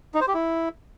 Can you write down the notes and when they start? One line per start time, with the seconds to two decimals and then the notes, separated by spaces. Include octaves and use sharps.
0.14 D#4
0.21 C5
0.28 G4
0.34 E4